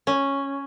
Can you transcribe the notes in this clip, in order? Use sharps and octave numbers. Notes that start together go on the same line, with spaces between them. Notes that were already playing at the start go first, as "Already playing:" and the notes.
C#4